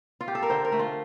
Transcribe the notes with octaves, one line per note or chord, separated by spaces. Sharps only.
F4
G4
A4
A#4
D3 C5
A#4
A3
F4